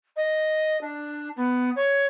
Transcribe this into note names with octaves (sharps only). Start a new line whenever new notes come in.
D#5
D4
B3
C#5